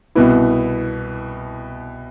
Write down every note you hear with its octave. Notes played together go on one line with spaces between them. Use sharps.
C2 B2 B3 E4